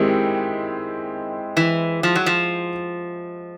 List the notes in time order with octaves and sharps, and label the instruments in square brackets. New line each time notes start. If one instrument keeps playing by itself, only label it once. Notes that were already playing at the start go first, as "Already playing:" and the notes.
Already playing: [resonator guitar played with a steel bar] D#3 [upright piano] G#3 C4 E4 G4
[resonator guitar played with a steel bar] E3
F3
F#3
F3